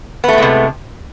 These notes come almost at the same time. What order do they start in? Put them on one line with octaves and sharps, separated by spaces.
B3 A3 A2 G#3 C3